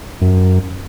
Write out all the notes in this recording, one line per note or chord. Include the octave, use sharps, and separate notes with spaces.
F#2